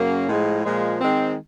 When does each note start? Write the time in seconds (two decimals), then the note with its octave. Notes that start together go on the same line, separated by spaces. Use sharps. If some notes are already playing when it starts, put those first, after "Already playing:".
Already playing: F#2 C#3 F#3 A#3 C#4
0.27 A2 F3 G#3
0.63 A#2 F3 G#3
1.01 D#3 G#3 C4